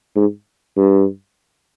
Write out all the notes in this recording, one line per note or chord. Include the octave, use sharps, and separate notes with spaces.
G#2
G2